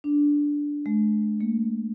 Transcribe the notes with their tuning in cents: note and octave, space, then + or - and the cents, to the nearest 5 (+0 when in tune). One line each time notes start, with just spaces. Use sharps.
D4 -5
G#3 +40
A#3 -30